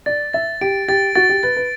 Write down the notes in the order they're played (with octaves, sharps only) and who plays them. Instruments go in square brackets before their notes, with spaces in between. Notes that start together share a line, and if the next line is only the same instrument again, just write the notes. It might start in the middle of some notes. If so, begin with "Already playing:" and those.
[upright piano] D5 [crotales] A6
[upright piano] E5 [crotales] A6
[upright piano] G4 [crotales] D7
[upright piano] G4 [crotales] A6
[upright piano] F#4 [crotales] A6
[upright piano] G4
[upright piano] B4 [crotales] A6
[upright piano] B4